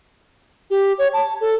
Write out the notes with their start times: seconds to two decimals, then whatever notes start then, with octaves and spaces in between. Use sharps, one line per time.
0.70 G4
0.98 C#5
1.13 A5
1.41 A4